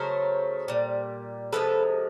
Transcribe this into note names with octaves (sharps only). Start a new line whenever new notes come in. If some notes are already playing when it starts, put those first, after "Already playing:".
Already playing: C#3 F#3 A3 A#4 C5
A#2 G3
C3 F3 G#3 A4 B4